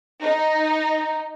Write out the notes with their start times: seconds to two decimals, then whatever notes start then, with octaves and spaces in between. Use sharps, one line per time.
0.22 D#4